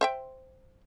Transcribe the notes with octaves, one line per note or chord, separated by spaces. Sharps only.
C5 E5 G5